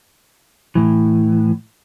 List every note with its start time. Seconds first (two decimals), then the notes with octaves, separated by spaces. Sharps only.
0.75 A2 E3